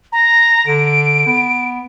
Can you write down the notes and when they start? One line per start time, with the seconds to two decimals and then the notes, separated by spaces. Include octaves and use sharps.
0.12 A#5
0.67 D3 D7
1.26 B3